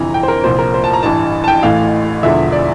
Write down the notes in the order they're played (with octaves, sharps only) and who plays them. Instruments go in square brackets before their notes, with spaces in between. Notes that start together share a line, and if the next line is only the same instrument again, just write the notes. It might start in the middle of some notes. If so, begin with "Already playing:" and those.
Already playing: [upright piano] G1 F2 C3 E3 A#5
G5
C5
A#4
C2 A#2 F3 C5
A#4
C5
A5
A#5
A1 G2 E3 A5
A5
G5
A1 A2 E3 F5
E1 E2 D3 F3 E5
D5